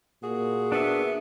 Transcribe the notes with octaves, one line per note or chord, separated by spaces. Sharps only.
A#2 F#4 G#4
B3 D4 E5